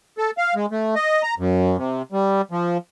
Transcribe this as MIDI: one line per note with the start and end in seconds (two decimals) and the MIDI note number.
0.18 0.31 69
0.38 0.54 77
0.55 0.66 56
0.71 0.95 57
0.96 1.22 75
1.23 1.34 82
1.39 1.77 42
1.77 2.02 48
2.12 2.42 55
2.51 2.77 53